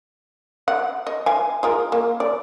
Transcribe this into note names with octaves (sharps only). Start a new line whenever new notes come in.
F#5
D#5
F5 G#5
F4 G#4 A#4
A#3
D5